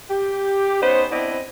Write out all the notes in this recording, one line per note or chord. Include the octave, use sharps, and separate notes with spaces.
G4
B3 C#4 D#4 C5
B3 C4 D4 E4 D#5